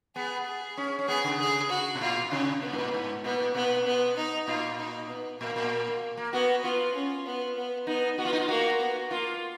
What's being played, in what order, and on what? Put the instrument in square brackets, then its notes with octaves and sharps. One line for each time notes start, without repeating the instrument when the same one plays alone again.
[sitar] B3 [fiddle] G#4
[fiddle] G#4
[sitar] C#4
C#4
[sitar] B3 [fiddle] G#4
[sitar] C#3
[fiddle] G#4
F#4
[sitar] B2
[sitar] A#2 [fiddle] F4
[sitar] C#3 [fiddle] C#4
[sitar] B2 [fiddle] B3
[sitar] G#2
A#2
G#2
[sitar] A#2 [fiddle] B3
[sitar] A#2
[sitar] B2 [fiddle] B3
[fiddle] B3
D#4
[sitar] A#2 [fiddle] F4
[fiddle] D#4
B3
[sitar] A#2 [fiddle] A#3
[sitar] A#2
A#3
[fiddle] B3 [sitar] F#4
[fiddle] B3 [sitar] F4
[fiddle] C#4
B3
B3
[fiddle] B3 [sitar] D#4
[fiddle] B3 [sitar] F#4
[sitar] F4
D#4
F4
[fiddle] A#3 [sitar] F#4
[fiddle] B3
[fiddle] A#3 [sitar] F4